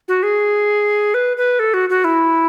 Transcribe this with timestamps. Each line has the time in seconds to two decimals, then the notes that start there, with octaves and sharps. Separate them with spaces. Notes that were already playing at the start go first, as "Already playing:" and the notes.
0.08 F#4
0.23 G#4
1.14 B4
1.37 B4
1.59 A4
1.74 F#4
1.90 F#4
2.04 E4